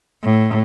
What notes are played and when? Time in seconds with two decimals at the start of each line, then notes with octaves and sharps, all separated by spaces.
0.23 A2